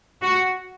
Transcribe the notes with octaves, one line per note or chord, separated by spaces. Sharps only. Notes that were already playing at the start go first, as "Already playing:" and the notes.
F#4